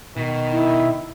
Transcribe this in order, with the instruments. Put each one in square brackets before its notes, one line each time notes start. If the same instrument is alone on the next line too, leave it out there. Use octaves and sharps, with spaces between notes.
[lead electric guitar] B2 [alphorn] D#3
[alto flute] E4